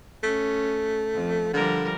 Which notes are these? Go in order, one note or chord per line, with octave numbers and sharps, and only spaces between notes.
A3 C#4
F2
D3 F3 G3 A#4